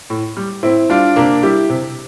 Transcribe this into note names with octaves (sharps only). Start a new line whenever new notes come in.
A2
G3
A2 C4 E4
G3 D4 F4
C3 A#3 D4
G3 E4 G4
C3